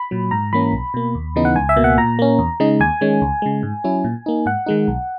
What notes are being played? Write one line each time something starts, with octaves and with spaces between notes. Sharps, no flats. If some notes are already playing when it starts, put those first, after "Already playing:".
Already playing: B5
A#2 F#3
G#2 A#5
E3 A#3 C#4 B5
B1
B2 A#3
D#2
C#3 E3 B3 D#4
F#5
C#2 G#5
E5
B2 A#3
F#5
A#2 A#5
A#3 C#4
E2
C#3 G#3 D#4
D#2 G#5
D#3 G#3 C#4
C#2
C#3 G#3
G#2
F#3 C#4 E4
A#2
A#3 D#4
G#2 F#5
D#3 G#3 D#4
B1